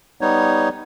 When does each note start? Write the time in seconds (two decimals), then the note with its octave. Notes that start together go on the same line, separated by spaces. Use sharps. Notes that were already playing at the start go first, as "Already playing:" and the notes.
0.21 G3 B3 D#4 C#5